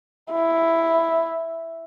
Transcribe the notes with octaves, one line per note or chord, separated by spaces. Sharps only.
E4